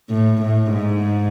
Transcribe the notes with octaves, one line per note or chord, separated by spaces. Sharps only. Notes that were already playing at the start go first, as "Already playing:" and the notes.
A2
A2
G#2